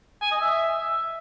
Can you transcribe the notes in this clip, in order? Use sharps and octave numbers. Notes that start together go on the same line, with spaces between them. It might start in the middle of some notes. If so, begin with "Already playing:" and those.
G#5
D#5
E5